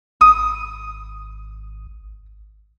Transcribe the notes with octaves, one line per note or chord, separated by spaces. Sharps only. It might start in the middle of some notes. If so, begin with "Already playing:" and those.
G#1 D#6